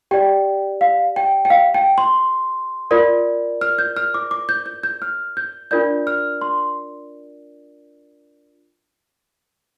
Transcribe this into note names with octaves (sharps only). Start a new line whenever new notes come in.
G4 D5 G5
F5
G5
G5
F5
G5
C6
F4 A#4 D5
F6
G6
F6
D6
D6
G6
G6
G6
F6
G6
D4 F4 A#4 D5 G6
F6
C6